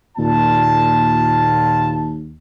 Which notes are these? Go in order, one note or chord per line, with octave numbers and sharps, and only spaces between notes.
D#2 A#2 F4 A5